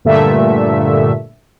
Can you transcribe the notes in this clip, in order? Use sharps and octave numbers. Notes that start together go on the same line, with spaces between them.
G2 A#2 D3 A3 E5